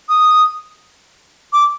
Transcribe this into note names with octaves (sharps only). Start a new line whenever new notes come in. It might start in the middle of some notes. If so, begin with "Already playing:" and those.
D#6
D6